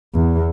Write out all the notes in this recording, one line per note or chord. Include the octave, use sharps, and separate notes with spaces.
E2